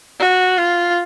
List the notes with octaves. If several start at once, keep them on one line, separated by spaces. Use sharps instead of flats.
F#4
F4